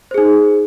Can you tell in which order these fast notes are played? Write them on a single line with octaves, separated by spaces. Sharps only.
C5 G#4 D#4